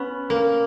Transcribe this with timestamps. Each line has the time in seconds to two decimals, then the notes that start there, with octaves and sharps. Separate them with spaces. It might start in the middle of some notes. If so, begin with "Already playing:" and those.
Already playing: B3 C#4
0.30 A#3